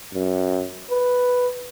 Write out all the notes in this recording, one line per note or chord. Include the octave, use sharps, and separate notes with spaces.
F#2
B4